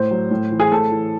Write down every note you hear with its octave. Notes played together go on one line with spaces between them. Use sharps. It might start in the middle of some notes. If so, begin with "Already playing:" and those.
Already playing: A2 C5
F#3
A2
E3
G#4
A2 A4
E3